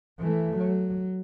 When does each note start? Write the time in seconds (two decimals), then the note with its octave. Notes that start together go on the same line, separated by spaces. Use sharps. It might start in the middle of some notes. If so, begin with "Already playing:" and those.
0.19 E3 A3
0.58 F#3